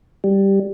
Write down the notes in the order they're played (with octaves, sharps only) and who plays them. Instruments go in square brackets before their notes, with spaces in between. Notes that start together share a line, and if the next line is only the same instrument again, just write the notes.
[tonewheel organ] G3